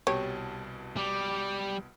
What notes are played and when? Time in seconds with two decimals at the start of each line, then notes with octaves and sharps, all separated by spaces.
0.07 C2 B2 G4 C#5 A5
0.97 G3 D6